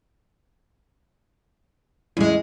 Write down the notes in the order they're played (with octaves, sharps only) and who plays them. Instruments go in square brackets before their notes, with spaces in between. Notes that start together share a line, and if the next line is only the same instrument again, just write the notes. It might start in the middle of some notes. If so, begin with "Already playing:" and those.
[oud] E2 G#3 [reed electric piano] G3 C#4 E4